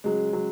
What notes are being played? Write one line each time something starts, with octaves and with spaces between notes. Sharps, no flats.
C#3 F#3 G#3
C#3 F#3